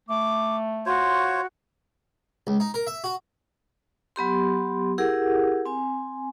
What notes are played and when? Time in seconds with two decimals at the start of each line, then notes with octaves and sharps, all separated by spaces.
0.09 A3 D6
0.86 F4 F#4 C5 C#5
2.47 C#2
2.60 D#4
2.74 A#4
2.87 E5
3.04 F#4
4.16 F#3 B3 G4 C6
4.98 E4 G4 G#4 A#4 F#5
5.66 C4 G#5